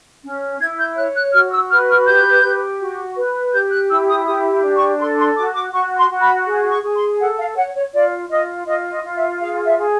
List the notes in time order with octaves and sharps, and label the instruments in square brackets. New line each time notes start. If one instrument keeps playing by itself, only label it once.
[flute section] C#4
E4 G#6
G6
C#5 F#6
F#6
F#4 F6
E6
B4 F6
F6
G4 G6
G4
F#4
B4
G4 G6
F#6
E4 E6
D#6
G4 D#6
D4
C#6
A4 C6
C6
F#4 D6
D6
F#4 C#6
C6
F#4
B5
G#4
C#6
G#4
C6
A4 F#5
F5
C#5 F#5
C#5
F4 D5
F4 D#5
F4 D#5
D#5
F4
E5
G#4 F5
E5
G#4